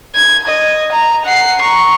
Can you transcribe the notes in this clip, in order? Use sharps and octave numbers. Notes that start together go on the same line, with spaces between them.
G#6
D#5
A#5
F#5 C7
A#5 C#6